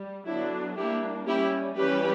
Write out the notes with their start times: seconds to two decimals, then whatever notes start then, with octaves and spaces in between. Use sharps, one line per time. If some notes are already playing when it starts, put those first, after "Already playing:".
Already playing: G3
0.25 D3 F#3 B3 D4 E4
0.77 G3 A#3 D4 E4 G4
1.26 G3 C#4 E4 G4
1.77 E3 G3 C#4 G4 B4